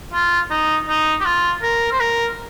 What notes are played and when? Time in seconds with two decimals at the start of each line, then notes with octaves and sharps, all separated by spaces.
0.13 F4
0.51 D#4
0.89 D#4
1.21 G4
1.25 F4
1.62 A#4
1.92 C5
2.00 A#4